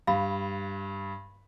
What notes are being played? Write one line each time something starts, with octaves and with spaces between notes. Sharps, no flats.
G2 F5 B5